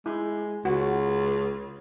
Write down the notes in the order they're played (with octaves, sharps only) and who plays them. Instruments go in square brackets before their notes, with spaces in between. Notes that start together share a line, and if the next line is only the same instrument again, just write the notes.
[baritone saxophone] G#3 [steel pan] E4
[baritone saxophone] C#2 [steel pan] F#4